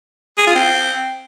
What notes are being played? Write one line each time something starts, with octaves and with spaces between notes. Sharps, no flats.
G#4
F4
C4